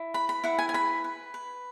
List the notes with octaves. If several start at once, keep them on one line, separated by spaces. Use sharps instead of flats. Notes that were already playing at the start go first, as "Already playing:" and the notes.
Already playing: E4
B4 B5
B5
E4 F#5
G#5
G#5
B4 B5
B4
B4